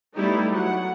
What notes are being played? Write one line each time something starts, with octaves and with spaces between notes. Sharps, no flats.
G3 A3 B3 D#4 E4 G4
F#3 F#5